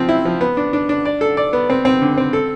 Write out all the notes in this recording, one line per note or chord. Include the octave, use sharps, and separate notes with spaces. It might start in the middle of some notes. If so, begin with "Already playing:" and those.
Already playing: F3 C4
E4
F3
B3
D4
D4
D4
D5
A4
D5
B3
C4
C4
D3
C4
A4